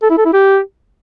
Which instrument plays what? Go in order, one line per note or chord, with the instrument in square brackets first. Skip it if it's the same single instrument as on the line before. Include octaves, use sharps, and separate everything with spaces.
[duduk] A4
E4
A4
E4
G4